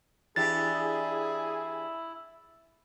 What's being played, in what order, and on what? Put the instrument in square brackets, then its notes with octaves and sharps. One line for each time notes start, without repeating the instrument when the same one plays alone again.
[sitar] E3 D4 G4 [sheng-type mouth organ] E4 [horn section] G#4 [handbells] A6